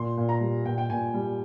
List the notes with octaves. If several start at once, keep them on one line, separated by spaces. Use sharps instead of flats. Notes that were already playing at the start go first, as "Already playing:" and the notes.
Already playing: A#2 C6
A#2
A#5
G3
A#2 G5
G5
A#2 G#5
G3